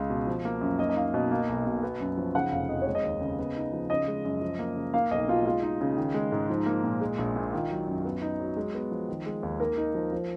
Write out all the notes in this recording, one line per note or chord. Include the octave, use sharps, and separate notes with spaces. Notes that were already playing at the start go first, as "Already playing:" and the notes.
Already playing: C#2 G#3
B2
F3
A#3
F#2
A#3 D#5
D#5
D#4 F5
B2 D#5
A#3 F5
B1
B2
B3
F#2
F3
C#3 F#5
F1 F5
F2 D#5
C#5
G#3
D#5
D#2
C#3
B3
D#4
F3
C#3 D#5
G#3
F#2
F3
A#3
C#3
A#3 F5
B1 D#5
B2 F4
G#3 F4
D#4
C#3
D#3
G#3
G#2
F3 D#4
A#3
A#2
G#3
A#1
A#2
D#3 F4
F#3
F#2
B3
D#4
F#3
G#3
B3
F3
D#3
G#3
D#2
A#3 A#4
D#4
F3
F3